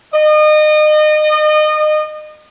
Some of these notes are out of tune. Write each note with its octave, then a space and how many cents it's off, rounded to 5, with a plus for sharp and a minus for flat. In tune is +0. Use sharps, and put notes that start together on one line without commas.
D#5 -30